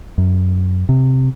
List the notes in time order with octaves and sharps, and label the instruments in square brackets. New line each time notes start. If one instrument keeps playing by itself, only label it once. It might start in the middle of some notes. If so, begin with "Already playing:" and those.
[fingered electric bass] F#2
C3